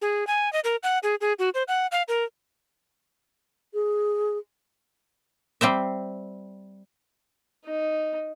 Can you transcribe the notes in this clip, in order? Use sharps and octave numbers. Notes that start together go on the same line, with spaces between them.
G#4
G#5
D#5
A#4
F#5
G#4
G#4
F#4
C5
F#5
F5
A#4
G#4
G3 C4 C5 E5
D#4